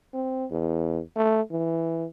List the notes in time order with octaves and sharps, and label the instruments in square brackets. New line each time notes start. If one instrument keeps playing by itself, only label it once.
[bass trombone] C4
E2
A3
E3